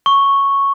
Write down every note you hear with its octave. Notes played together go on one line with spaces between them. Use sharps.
C#6